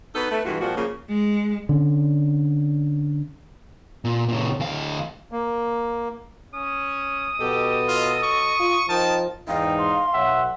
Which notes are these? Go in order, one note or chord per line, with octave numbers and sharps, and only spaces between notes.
B3 D#4 F#4 A4 B4
A3 B4
G2 B2 E3 G#3 F4 F#4
A#2 F3 G3 C4 F#4
C#3 F3 A#3
G#3
D3 C#4
A#2
A#2 C#3
D2 F5
A#3
C#4 D#6
B2 F#3 G4 A4 D#5
F4
C#6
F4
F3 D#4 A#4 G5 A5
E2 G#2 D#4 F5 G5
C6
B1 C#5 E5 F#5